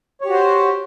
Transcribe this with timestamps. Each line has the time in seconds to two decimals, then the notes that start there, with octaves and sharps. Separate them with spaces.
0.21 C#5
0.25 G4
0.29 F#4
0.33 C5